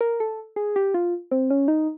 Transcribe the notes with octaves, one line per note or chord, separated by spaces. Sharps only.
A#4
A4
G#4
G4
F4
C4
C#4
D#4